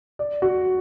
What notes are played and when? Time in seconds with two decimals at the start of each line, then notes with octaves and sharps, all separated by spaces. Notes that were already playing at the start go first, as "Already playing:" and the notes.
0.19 D5
0.42 F#4